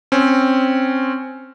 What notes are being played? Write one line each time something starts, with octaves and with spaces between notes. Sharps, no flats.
C4 C#4